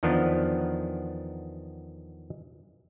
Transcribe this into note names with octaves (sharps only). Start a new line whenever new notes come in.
E2 D#3 F3 B3 C4 D4